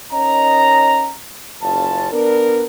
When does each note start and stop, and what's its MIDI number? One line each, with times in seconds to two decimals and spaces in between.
0.12 1.13 61
0.12 1.13 63
0.12 1.13 70
0.12 1.13 75
0.12 1.13 82
1.62 2.09 30
1.62 2.09 61
1.62 2.09 65
1.62 2.09 68
1.62 2.09 81
2.12 2.66 59
2.12 2.66 62
2.12 2.66 70